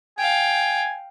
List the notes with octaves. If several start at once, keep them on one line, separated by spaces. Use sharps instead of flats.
F5 G5 G#5